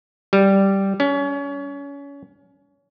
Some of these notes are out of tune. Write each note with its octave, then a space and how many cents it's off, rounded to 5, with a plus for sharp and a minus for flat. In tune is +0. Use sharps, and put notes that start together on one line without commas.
G3 -5
C#4 +30